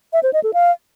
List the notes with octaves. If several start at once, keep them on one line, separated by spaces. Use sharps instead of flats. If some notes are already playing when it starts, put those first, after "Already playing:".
E5
C5
D#5
A4
F5